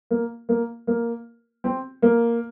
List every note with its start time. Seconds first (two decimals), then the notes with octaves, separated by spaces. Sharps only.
0.11 A#3
0.49 A#3
0.87 A#3
1.64 C4
2.02 A#3